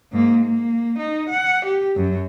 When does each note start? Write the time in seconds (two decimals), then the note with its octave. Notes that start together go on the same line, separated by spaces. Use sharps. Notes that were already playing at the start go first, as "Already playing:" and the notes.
0.12 G#2 A#3
0.45 A#3
0.98 D#4
1.29 F#5
1.65 G4
1.96 F#2